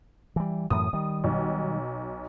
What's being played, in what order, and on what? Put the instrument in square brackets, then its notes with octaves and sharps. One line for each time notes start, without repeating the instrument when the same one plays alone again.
[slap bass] E3 G3
[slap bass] F#2 A2 E3 [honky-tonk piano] D#6
[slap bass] D#3 G3
[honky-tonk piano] B1